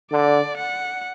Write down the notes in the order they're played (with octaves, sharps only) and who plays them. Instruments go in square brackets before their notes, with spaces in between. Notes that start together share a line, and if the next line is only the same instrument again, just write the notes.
[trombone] D3 [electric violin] D5
[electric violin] F#5